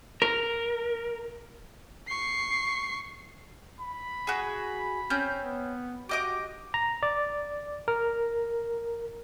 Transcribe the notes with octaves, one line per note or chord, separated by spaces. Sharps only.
A#4
C#6 C7
B5
F#4 G#4
C4 C#4 G6
B3
F#4 G4 D#5 D6
A#5
D5
A#4